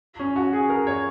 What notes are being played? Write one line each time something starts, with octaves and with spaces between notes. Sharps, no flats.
C#4
F#4
G#4
A#4
C#5